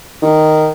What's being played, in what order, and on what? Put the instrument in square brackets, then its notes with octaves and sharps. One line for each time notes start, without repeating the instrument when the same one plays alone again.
[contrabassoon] D#3